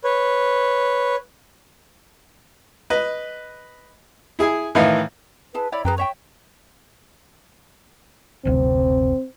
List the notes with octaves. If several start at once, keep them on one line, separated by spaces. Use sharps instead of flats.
B4 C#5
B4 D#5
E4 G#4 G#5
A2 D#3 E3 D#4 F5
E4 G#4 B4 A5
E4 C#5 D5 B5
F#2 G#4 B4 G5 A#5
C#5 E5 G5 C#6
F#1 D2 C3 C4